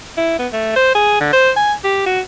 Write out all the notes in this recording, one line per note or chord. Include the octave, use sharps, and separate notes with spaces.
E4
B3
A3
C5
G#4
D3
C5
G#5
G4
F#4